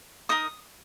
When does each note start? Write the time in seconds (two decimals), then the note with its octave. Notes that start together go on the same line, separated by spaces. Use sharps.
0.29 D#4 A#4 D#5 D#6